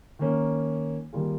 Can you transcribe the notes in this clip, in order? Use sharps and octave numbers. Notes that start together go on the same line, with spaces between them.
D#3 A#3 C#4
D#3 G3 A#3 F4 G#4